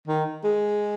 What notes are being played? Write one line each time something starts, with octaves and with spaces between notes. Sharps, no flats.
D#3
G#3